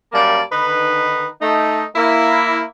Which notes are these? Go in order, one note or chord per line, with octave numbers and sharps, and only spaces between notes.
F#2 G3 A#3 D5 F5 A5
D3 D#3 D#4 B4
A3 D#4
A#3 E4